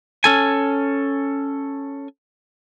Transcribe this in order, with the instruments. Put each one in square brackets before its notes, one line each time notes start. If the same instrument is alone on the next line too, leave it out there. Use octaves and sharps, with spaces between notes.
[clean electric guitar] C#4 A4 G#5